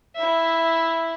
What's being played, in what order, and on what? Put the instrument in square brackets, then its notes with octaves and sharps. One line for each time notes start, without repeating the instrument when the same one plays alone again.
[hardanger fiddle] E4 E5